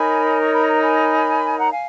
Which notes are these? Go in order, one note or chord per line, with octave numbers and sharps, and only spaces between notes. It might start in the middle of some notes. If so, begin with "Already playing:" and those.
Already playing: D#4 A#4 C#5 G#5 B5
C#6
B5
A#5
G#5 B5
F#5 A#5
F5 G#5